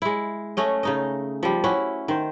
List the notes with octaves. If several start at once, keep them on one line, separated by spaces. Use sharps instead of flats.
G#3 E4
A3 C#4 D#5
C#3 D#4 D#5
F3 G3
C#4 E4 F#4
D#3 C5